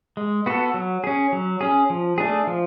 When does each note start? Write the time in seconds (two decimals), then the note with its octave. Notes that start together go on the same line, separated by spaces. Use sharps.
0.17 G#3
0.46 B3 F#4 A4
0.74 F#3
1.04 C#4 G#4
1.33 F#3
1.61 C#4 G#4
1.90 F3
2.18 A3 D4 G#4
2.47 F3